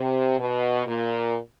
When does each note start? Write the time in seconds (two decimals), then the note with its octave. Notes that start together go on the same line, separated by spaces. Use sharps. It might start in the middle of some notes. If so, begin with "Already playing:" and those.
Already playing: C3
0.40 B2
0.86 A#2